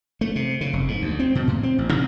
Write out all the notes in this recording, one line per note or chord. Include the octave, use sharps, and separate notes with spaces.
A3
C3
C#3
F1
G#2
D2
C4
B2
A2
C4
A1
C3